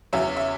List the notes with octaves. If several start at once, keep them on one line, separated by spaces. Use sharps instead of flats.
E2 C#3 F#3 C#4 E5
E5